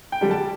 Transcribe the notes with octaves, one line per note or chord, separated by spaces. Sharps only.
G5
D3 G3
A5